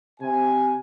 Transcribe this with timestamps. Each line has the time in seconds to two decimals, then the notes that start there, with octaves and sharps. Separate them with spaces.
0.20 C3 G#5